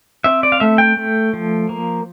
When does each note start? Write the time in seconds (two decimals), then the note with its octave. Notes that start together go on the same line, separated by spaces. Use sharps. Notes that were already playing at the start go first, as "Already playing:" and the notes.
0.24 C4 E5
0.43 D5
0.52 F5
0.60 A3 E5
0.78 G5
0.97 A3
1.33 F3
1.69 A#3